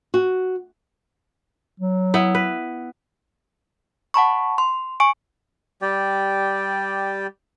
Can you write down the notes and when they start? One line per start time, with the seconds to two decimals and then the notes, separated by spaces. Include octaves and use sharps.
0.14 F#4
1.80 F#3
2.14 B3 E4
2.35 B4
4.14 F#5 A5 B5 C#6
4.58 C6
5.00 G#5 C#6 D7
5.82 G3 G4 D5 G5